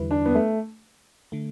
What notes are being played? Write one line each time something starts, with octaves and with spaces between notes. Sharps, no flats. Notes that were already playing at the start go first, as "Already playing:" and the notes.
Already playing: E2 D3 G3 E4 B4
D4
B3
A3
D3 A3